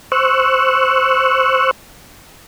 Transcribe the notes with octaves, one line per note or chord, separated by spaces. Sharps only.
C5 C#6 E6 F#6